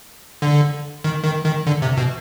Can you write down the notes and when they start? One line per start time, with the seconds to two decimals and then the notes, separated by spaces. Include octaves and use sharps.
0.42 D3
1.04 D#3
1.24 D#3
1.45 D#3
1.67 D3
1.82 C3
1.97 B2